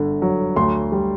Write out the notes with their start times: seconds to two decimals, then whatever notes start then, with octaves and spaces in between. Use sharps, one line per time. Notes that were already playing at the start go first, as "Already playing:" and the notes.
Already playing: G1 D3
0.22 F#3
0.56 D2 C6
0.92 G3